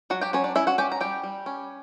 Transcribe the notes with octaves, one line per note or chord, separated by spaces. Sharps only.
F#3 F#4 F#5
G4 G5
F#3 C#4 C#5
D4 D5
C#4 E4 E5
F#4 F#5
C#4 G4 G5
A#5
G3 G4 G5
G3
C#4